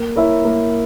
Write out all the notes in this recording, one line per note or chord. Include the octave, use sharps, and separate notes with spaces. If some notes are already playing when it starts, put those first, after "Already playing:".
Already playing: A#3
E4 A#4 C#5 E5
A#3